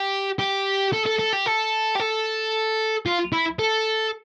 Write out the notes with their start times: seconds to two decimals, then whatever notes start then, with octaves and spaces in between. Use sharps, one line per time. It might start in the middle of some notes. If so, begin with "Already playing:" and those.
Already playing: G4
0.39 G4
0.93 A4
1.06 A4
1.19 A4
1.33 G4
1.46 A4
1.95 G4
1.99 A4
3.06 F4
3.33 E4
3.59 A4